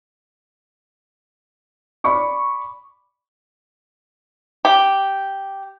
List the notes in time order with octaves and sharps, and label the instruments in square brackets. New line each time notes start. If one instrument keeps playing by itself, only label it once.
[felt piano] D5 B5 C#6 D6
[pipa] G4